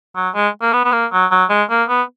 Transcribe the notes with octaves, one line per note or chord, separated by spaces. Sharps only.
F#3
G#3
A#3
B3
B3
A#3
F#3
F#3
G#3
A#3
B3